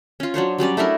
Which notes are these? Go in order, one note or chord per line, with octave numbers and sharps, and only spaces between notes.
C#4 F4
F#3 D4 C5 C#5
F#3 G3 C#4 D5
A3 D4 E4 A#4